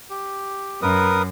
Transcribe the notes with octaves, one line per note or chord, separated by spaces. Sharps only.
G4
F#2 A#4 B4 D#6